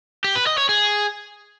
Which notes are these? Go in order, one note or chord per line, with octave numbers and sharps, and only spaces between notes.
G4
B4
D#5
C#5
G#4